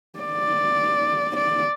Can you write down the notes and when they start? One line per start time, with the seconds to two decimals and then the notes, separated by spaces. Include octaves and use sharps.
0.19 D5
1.37 D5